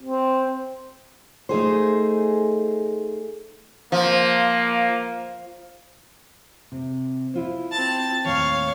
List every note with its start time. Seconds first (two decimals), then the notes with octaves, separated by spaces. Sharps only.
0.03 C4
1.49 A3 D#4 G#4 C5
3.92 F3 A#3
6.72 C3
7.34 E4 F4 C5
7.72 C4 A5
8.25 D#2 A2 C#5 F5